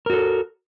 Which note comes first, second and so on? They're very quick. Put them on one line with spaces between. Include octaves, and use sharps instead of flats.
A#4 F#4 A4